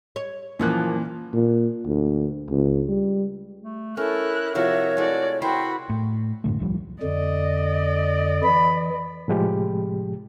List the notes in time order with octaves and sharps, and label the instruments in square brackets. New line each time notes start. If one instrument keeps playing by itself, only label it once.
[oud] C#5
[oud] F#2 F3 A#3 [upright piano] A#2 E3 F#6
[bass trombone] A#2
D2
C#2
G3
[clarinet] A3
[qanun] C#4 [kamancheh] E4 F#6 [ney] A4 [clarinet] A#4
[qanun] C3 F3 E4 [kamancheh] F#4 E5 [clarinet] A#4 [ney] C#5
[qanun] G#3 A3 E4 [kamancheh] F#4 D5
[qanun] E4 A#4 C5 [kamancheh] F#4 B5 [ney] G5 [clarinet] C6
[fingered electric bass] A2
F#2 A2 D3 A3
D1 C2 F3 G3
[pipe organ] F2 D3 [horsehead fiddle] D5 D#5
[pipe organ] E3 [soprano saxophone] B5
[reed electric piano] A2 C3 F3 G#3 G4